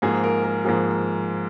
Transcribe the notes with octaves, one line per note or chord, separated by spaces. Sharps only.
G#2 F3 A#3 G#4
A#4
A#4
G#2 F3 A#3 G#4